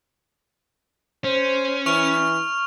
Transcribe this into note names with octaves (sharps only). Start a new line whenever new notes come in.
C#4 C5
E3 C#6 F6 F7